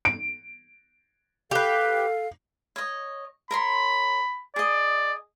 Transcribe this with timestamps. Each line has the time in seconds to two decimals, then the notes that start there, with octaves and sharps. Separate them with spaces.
0.05 D7
1.51 G4 A4 B4 F5
2.76 C#5 D#5
3.51 A#4 C#5 B5 C6
4.56 G#4 D5 D#5